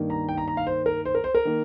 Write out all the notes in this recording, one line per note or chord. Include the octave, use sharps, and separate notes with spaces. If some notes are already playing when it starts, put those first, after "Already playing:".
Already playing: G2 D#3 A#3
A#5
G5
A#5
A#5
F5
C5
A#4
C5
A#4
C5
A#4
D#3 A#3